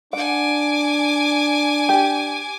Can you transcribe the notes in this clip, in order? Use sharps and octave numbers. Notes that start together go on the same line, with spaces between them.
D4 F#5 G#5 D6
G4